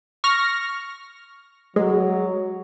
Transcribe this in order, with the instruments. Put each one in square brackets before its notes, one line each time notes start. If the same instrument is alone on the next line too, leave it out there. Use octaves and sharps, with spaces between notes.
[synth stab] C#6 F6 A#6
[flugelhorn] F#3 [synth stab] G#3